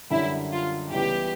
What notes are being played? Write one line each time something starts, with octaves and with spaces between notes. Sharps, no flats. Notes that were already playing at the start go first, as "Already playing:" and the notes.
F#2 D3 G3 E4
F4
C#2 C#3 E3 G3 B3 G4